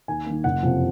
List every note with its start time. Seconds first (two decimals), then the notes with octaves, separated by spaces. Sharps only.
0.08 D#2 G#5
0.26 D#3 A#3
0.44 F#1 F#5
0.63 F2 C3 F3 C4